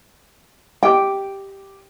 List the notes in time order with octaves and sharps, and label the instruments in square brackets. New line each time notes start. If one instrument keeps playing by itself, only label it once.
[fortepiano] G4 D#5 D6 [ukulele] G5